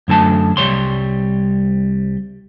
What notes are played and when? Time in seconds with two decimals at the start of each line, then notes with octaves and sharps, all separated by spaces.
0.08 F#2 D3 A3 A5
0.57 C2 G2 G3 C#5 C6